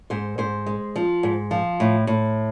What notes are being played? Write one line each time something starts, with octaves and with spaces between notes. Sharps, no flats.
G#2 C5
G#2 C5
G#3
F3
G#2
F3
A2
A2